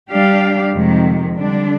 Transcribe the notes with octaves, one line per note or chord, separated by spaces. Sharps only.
G3 D4 G4 D5 F5
F2 C3 D#3 G#3
D3 G3 D4